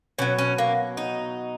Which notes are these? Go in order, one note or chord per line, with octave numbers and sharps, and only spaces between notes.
B2 F#3 C#4
C#4
A#3
D#4